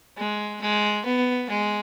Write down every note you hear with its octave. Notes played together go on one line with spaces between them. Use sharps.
G#3
G#3
B3
G#3